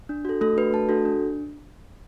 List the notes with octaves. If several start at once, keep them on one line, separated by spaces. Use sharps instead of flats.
D4
F#4 A4
A3 A4
D4 F#4 A4 B4
A3 A5
D4 F#4 A4
D4